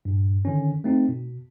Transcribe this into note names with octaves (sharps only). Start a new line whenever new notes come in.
G2 A#2
D3 D#3 C#4
A3 C4 D#4
B2